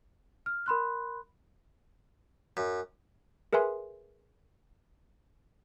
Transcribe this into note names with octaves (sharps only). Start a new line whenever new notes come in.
F6
A#4 B5 C6 F#6
F#2
G#4 A#4 B4 E5 G#5 C6